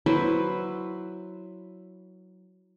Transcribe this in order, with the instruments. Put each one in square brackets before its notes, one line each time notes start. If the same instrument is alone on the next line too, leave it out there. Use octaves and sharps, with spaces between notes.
[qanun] F#3 E4 B4 C5